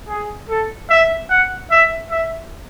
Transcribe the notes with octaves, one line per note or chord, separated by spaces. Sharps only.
G#4
A4
E5
F#5
E5
E5